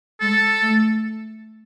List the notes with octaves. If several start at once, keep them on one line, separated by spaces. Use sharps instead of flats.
G#3 A4
A3